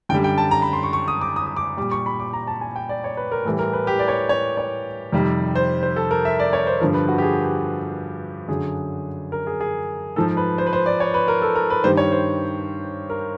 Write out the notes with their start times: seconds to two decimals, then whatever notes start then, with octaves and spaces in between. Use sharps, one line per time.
0.09 F#2 D3 G3 G5
0.24 G5
0.38 A5
0.51 A#5
0.62 B5
0.73 C6
0.83 C#6
0.93 C#6
1.08 D#6
1.21 D6
1.36 D#6
1.46 D#6
1.57 D6
1.77 A#2 G3 D6
1.91 C#6
2.06 B5
2.20 D6
2.33 A#5
2.47 A5
2.61 G#5
2.76 G5
2.89 D5
3.04 C#5
3.17 B4
3.32 A#4
3.45 A2 E3 G3 A4
3.59 A#4
3.73 B4
3.87 G4
3.99 D5
4.08 C#5
4.29 C#5
4.57 C#5
5.12 F2 C3 D#3 G3
5.55 C5
5.83 C5
5.96 A4
6.11 A#4
6.25 E5
6.39 D5
6.53 C#5
6.67 C5
6.80 G2 D3 F3 A#4
6.94 B4
7.09 F#4
7.18 G4
7.22 G#4
7.44 G4
8.48 F#2 D3 F#3 G#4
9.32 A#4
9.47 G#4
9.61 G#4
10.16 G#2 F3 A4
10.37 B4
10.58 C5
10.67 B4
10.73 C5
10.86 D5
11.00 C#5
11.14 B4
11.28 A#4
11.42 A4
11.56 A#4
11.70 B4
11.84 G2 D#3 G3 C5
11.97 C#5
12.12 C5
13.10 A#4